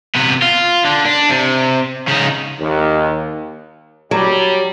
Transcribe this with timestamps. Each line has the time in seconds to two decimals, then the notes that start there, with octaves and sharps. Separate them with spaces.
0.15 C3 B3
0.42 F4
0.85 D3
1.05 D4
1.29 C3
2.08 C#3 D#4
2.59 D#2
4.11 F#3 G3